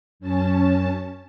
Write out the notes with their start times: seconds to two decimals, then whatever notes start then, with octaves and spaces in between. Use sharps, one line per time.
0.20 F#2 C#4 A5